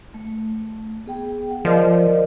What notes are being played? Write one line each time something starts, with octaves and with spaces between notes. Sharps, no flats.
A3
B3 G#4 G5
F#5
F3 A#4 D5 D#5